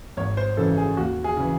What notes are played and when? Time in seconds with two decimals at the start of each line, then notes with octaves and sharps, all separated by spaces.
0.17 G#1 C#5
0.37 C5
0.57 F#2 C#3 E3 A4
0.77 G#4
0.97 D#2 F#4
1.24 G#4
1.37 C#3 E3